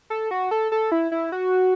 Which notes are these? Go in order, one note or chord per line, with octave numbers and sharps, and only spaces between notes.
A4
F#4
A4
A4
E4
E4
F#4